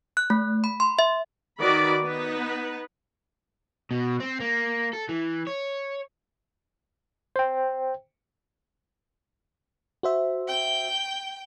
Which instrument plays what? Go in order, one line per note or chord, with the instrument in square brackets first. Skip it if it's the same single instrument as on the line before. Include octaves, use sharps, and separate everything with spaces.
[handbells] F#6
A3
B5
C6
E5
[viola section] D#3 F#4 B4 D5 B5
B3 D#4 B4
[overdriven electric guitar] B2
C4
A#3
A4
E3
C#5
[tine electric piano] C5 G5
[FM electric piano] F#4 C5 E5
[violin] G5 G6